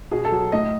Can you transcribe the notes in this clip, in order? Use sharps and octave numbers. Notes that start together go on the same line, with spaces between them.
B2 G#4
A4
F#3
A2 D#5